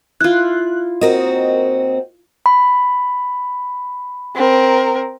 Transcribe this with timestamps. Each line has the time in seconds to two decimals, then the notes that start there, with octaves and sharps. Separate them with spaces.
0.21 E4 F4 F#6
1.01 D#2 C4 F#4 A#4 D#5
2.46 B5
4.36 C4 A#4